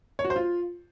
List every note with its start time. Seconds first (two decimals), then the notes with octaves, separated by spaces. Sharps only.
0.19 C#5
0.25 F#4
0.30 C5
0.36 F4